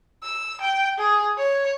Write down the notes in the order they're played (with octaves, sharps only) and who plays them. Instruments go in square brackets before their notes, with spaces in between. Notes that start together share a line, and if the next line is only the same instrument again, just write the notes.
[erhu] E6
G5
G#4
C#5